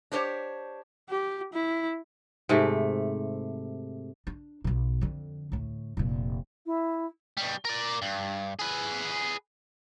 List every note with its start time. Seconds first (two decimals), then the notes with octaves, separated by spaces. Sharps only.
0.12 D4 G4 C5 C#5
1.09 G4
1.53 E4
2.49 G#2 C3 A3
4.27 D4
4.64 B1 B2
5.01 F2 D3
5.52 D2 A2
5.97 F1 A#2
6.66 E4
7.37 B2 G3
7.65 A#4 D5
8.02 G2
8.59 G#4 B4